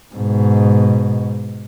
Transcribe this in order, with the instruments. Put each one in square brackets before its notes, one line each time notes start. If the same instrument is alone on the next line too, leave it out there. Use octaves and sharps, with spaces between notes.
[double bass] G#2 B2